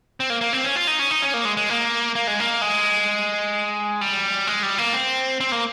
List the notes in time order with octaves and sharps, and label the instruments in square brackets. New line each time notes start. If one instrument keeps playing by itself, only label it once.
[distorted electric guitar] C4
A#3
A#3
C4
C#4
F4
D#4
C#4
D#4
C#4
A#3
G#3
G#3
A#3
A#3
G#3
A#3
G#3
G3
G#3
G3
A#3
C4
C4
A#3